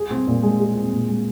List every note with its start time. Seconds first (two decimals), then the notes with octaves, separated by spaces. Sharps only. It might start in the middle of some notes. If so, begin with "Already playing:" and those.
Already playing: G#4
0.11 C4
0.27 A#2
0.43 G#3
0.60 G#4
0.76 C4
0.93 A#2
1.09 G#3